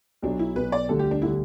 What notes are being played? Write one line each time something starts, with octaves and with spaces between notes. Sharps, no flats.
B1 B2 F#3 D4
E4
B1 B2 F#3 B4
D5
D2 D3 G3 A4
G4
D4
D3 G3 E4